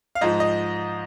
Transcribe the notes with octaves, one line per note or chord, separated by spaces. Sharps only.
F5
G#2 F3 D#5
D#5